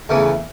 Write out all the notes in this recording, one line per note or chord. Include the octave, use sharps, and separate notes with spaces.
E2 C#3 E3 A3